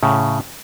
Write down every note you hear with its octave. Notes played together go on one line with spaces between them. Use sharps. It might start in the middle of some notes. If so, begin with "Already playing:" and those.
A2 C#3